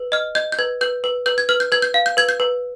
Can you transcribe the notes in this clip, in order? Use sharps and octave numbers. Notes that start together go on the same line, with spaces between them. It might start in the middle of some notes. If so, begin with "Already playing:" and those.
Already playing: B4
D#5 F6
D#5 G6
G6
B4 G#6
B4 G6
B4
B4 G6
G#6
B4 F6
G6
B4 G#6
G6
F5
G6
B4 G#6
G6
B4